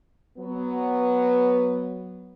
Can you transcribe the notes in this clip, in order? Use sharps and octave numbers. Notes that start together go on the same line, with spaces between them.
F#3 B3